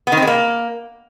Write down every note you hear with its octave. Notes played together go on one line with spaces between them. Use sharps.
B3
D#3
C4
G#3
A#3